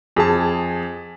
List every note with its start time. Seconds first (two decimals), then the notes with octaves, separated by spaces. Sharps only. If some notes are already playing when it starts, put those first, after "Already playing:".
0.16 F2 G#4 A5